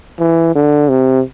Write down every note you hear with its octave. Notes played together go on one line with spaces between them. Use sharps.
E3
D3
C3